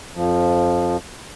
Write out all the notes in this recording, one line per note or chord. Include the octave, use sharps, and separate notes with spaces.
F2 F3